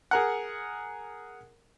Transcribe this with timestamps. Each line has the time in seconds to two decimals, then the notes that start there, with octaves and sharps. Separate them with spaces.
0.11 G#4 A#4 F#5